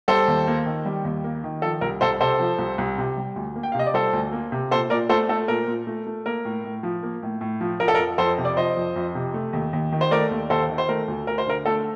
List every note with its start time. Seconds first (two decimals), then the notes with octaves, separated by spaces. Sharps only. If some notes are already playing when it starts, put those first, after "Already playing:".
0.08 G3 A4 C5
0.28 D#2
0.47 A#3
0.66 D#3
0.86 G3
1.05 D#2
1.24 A#3
1.44 D#3
1.62 F3 A4
1.81 C2 A#4
2.01 C2 A4 C5
2.20 C3 A4 C5
2.40 F3
2.59 C2
2.78 C2
2.98 C3
3.17 G3
3.36 D2
3.56 A#3
3.63 G5
3.72 F5
3.75 C3 D#5
3.86 D5
3.94 G3 A4 C5
4.13 D2
4.32 A#3
4.52 C3
4.71 A#2 A4 C5
4.90 A#2 A#4 D5
5.09 A3 A4 C5
5.29 A3 A4
5.48 A#2 A#4
5.68 A#2
5.87 A3
6.07 A3
6.26 A#3 A#4
6.45 A2
6.64 A2
6.83 F3
7.03 A#3
7.23 A2
7.41 A2
7.61 F3
7.80 F3 A#4
7.88 A4
7.95 A#4
7.99 F2
8.18 F2 A4 C5
8.38 C3
8.45 D5
8.57 F3 C5 D#5
8.77 F2
8.96 F2
9.15 C3
9.34 A3
9.53 D#2
9.73 D#2
9.92 D#3
10.01 C5
10.11 A3 A#4 D5
10.31 D#2
10.50 D#2 A4 C5
10.70 D#3
10.78 C5
10.89 A3 A#4
11.08 D2
11.27 D2 A#4
11.38 C5
11.47 D3 A#4
11.66 A3 A4